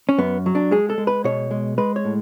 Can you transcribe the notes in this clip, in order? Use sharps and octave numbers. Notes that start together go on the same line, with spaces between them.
C#4
F#2 B3
F#3
D4
G#3 G#4
A4
G#3
B4
B2 C#5
G#3
G#3 B4
C#5
A2